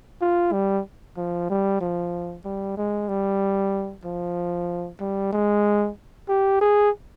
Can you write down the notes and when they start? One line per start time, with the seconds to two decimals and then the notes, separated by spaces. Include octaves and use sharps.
0.21 F4
0.52 G3
1.16 F3
1.49 G3
1.80 F3
2.45 G3
2.77 G#3
3.08 G3
4.04 F3
5.00 G3
5.32 G#3
6.28 G4
6.61 G#4